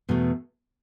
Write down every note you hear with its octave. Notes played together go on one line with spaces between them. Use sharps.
E2 B2 A3